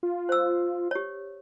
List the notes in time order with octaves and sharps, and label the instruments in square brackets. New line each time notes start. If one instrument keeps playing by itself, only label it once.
[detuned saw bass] F4
[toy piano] C5 E6
G4 C#5